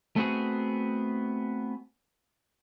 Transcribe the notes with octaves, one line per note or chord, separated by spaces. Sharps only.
A3 B3 C4 F#4 G#4